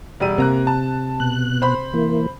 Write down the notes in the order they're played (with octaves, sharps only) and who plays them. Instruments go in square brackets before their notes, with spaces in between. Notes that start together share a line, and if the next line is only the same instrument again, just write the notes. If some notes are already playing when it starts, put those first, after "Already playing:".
[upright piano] E1 G3 D#7
[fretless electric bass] C3 [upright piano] A#3 A#5 F#6
[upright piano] A5
[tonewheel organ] B2 F#6
[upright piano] C5 B5
[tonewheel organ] E3 A#3